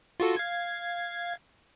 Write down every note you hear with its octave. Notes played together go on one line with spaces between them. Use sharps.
F4 F#4 A4
F5 G#6